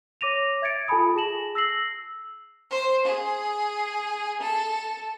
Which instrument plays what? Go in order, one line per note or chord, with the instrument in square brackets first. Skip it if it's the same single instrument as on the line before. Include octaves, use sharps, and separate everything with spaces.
[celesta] C#5 D6 A#6 D#7 F7
E5 G#6 A6 C#7 D7
F4 A4 G#5 A5 B5 D#6
G#4 A5 A#6 E7 F#7
E6 A#6 C7 F#7
[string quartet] C5
G#4
A4